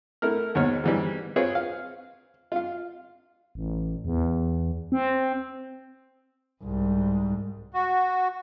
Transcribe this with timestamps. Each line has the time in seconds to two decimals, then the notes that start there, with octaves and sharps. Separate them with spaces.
0.22 A3 E4 A#4 F6
0.55 D#2 G#2 B2 C#5 F6
0.83 G#2 E3 G3
1.36 C4 F4 G#4 B4 C#5
1.55 F5
2.52 F4 F5
3.55 A1
4.05 E2
4.92 C4
6.63 C2 G#2
7.74 F#4